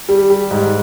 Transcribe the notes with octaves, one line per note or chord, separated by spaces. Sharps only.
G3
G3
G#2